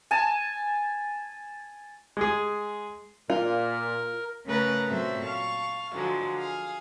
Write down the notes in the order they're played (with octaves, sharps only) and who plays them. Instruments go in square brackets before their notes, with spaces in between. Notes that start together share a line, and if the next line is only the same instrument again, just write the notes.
[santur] G#5 A5
[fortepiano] G#3 G#4
[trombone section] A#2 [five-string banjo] F4 [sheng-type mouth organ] A#4
[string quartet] C#3 A3 A#4 B4 A#5 A6
A#2 F#3 C4 A4 C5 E5
F5 A5 C#6
D3 F3 F#3 G#3
G#4 F5